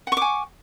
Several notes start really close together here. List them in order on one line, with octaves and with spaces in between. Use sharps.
F#5 C#6 D6 G#5